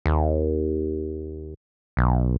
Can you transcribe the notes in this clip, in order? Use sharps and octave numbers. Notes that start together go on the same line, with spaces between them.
D#2
B1